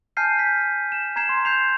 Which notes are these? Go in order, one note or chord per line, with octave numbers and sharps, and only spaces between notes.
G#5 A5 F6 G6 C7 D#7
B6
E7
A#5 G#6 C7 E7
C6
G6 C7 F7